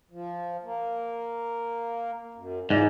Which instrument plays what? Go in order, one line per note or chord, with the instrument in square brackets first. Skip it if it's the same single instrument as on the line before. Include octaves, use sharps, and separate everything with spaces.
[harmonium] F3
A#3
F#2
[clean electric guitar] G#2 [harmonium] E3 F3 D5